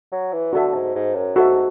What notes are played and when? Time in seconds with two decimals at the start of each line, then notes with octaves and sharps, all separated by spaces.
0.12 F#3
0.33 E3
0.53 D3 F#4 A4 E5
0.74 G#2
0.95 G#2
1.16 F#2
1.36 G#2 F#4 A4 E5